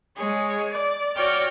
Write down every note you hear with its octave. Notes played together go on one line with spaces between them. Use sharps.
G#3 G#4 C#5
D5
F#4 C#5 D5 G5 F6